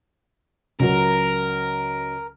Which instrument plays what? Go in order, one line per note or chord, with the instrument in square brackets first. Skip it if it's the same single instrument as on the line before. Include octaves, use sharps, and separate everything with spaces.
[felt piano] C#2 F#3 [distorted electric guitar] A#4